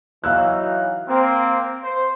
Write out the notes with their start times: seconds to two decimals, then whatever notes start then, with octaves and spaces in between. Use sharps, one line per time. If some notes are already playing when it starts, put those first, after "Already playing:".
0.24 E3 F#3 D#4 F5 E6 F#6
1.08 A#3 C4
1.83 C5